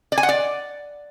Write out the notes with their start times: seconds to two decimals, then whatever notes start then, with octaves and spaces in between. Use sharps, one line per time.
0.12 D5
0.18 G#5
0.23 F#5
0.29 D5